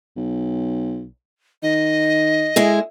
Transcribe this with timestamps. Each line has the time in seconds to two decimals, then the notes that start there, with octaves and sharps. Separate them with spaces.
0.17 B1
1.63 D#3 D#5
2.56 G#3 E4 G#4